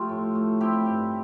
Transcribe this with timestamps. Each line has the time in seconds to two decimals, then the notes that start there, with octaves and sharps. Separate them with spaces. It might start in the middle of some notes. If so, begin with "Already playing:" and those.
Already playing: F3 A3 F4 G4
0.09 A2
0.35 A3
0.61 C4 E4 G4
0.86 G2